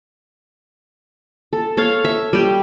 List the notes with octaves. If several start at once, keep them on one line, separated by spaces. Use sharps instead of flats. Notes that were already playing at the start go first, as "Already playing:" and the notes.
A4
A4 C#5 F5
E5
G3 G4